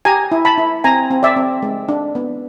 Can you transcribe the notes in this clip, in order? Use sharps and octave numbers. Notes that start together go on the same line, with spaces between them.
G4 G#5 A#5
E4
A5 B5
E4
C4 G#5 A#5
C4
D5 E5
C4
G#3
D4
B3